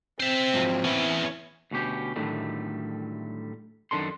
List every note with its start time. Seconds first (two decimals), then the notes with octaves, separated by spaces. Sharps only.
0.20 C4 C5 E5
0.54 G#2 F3 F#3
0.84 E3 B3 C#4 E4
1.71 D2 B2 C#4 G4
2.16 A2 D3 D#3 F#3 G3 A3
3.91 F#2 D#3 D4 A4 C6